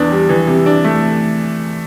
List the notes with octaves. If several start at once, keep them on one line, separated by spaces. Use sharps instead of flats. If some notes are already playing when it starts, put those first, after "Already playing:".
Already playing: E2 E3 D4
G3
E3
C3
D4
A3